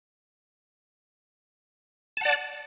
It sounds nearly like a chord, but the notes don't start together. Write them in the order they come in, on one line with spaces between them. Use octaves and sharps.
A5 F#5 D5